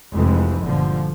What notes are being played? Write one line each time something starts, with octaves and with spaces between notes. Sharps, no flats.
F1 C2 F2 E3 G#3
G1 A#2 D3 F3